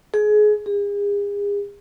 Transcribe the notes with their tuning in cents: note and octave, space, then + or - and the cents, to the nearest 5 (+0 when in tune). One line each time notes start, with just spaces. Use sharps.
G#4 +25
G#4 -40